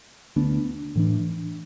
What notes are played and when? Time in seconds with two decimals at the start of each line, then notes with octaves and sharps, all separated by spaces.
0.36 D2 D3 B3 D4
0.95 A2 E3 D4